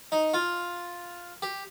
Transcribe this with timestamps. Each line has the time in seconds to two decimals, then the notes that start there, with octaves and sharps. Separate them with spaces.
0.12 D#4
0.34 F4
1.42 G4